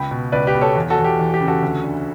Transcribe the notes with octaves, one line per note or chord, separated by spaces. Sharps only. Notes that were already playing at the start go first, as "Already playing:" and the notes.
Already playing: C#2 G5 B5
B2
C#2 B4 D5
G4 B4
B2
A4 C#5
E2
F#4 A4
E2
G4
E3
G4
C#3
F#4 A4
D2
D3